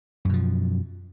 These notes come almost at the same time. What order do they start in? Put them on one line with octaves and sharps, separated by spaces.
F#2 B2 F3